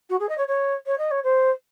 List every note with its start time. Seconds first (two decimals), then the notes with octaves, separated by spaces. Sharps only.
0.09 F#4
0.19 G#4
0.29 D#5
0.37 C#5
0.47 C#5
0.86 C#5
0.98 D#5
1.11 C#5
1.23 C5